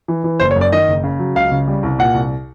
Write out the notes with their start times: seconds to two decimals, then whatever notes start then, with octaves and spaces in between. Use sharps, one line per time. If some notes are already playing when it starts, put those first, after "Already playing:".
0.08 E3
0.24 E3
0.40 F#1 C5
0.51 C#5
0.56 F#2
0.61 D5
0.72 D#3 D#5
0.88 F#1
1.03 C#3
1.19 F#3
1.35 C#2 F5
1.52 C#3
1.68 G3
1.83 C2
1.99 A#2 F#5
2.14 C2